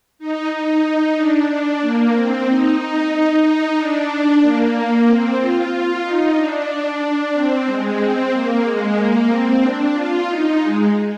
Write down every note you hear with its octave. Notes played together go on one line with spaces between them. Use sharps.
D#4
D#4
D4
D4
A#3
C4
D#4
D#4
D#4
D#4
D4
A#3
C4
F4
F4
D#4
D4
C4
G#3
C4
A#3
G#3
A#3
C4
D4
F4
D#4
G#3